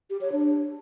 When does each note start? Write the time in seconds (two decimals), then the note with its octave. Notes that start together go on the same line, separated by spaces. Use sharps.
0.10 G4
0.21 C#5
0.32 D4